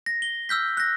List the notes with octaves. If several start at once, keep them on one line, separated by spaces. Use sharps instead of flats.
A#6
G7
E6 F6 G6 B6
F#6 A#6